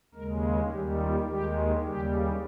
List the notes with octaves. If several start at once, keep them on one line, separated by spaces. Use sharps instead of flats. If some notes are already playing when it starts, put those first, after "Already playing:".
D#2 C#3 G#3 A#4
D#2 D#3 G3 G4
F4
D#2 D#3 G#3 G4
D#2 C#3 G3 G4